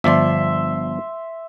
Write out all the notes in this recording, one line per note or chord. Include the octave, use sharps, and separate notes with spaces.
G1 F3 D5 E5 C6